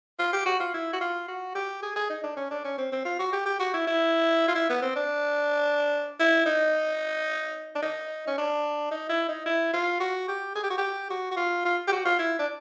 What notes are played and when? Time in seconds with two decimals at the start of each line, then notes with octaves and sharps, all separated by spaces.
0.19 F4
0.33 G4
0.46 F#4
0.60 F4
0.74 E4
0.93 F#4
1.01 F4
1.28 F#4
1.55 G4
1.83 G#4
1.96 G#4
2.09 D#4
2.23 D4
2.36 C#4
2.50 D4
2.64 C#4
2.78 C4
2.92 C4
3.05 F4
3.19 F#4
3.33 G4
3.46 G4
3.59 F#4
3.74 E4
3.87 E4
4.48 F4
4.55 E4
4.69 B3
4.82 C4
4.96 D4
6.19 E4
6.46 D#4
7.75 D4
7.82 D#4
8.27 C#4
8.38 D4
8.91 D#4
9.09 E4
9.28 D#4
9.46 E4
9.73 F4
10.00 F#4
10.28 G4
10.55 G#4
10.63 G4
10.70 F#4
10.78 G4
11.10 F#4
11.31 F#4
11.37 F4
11.65 F4
11.87 G4
11.92 F#4
12.05 F4
12.19 E4
12.39 D4